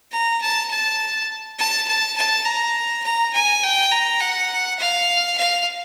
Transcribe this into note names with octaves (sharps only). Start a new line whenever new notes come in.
A#5
A5
A5
A5
A5
A5
A#5
A#5
G#5
G5
A#5
F#5
F5
F5